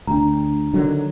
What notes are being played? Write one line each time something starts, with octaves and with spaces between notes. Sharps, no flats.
D2 D4 A#5
D3 D#3 F#3